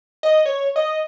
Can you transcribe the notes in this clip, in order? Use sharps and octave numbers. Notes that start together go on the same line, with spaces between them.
D#5
C#5
D#5